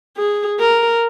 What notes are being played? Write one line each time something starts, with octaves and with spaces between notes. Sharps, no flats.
G#4
A#4